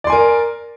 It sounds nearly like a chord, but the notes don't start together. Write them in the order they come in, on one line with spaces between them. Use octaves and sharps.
D5 C6 G#5 A#4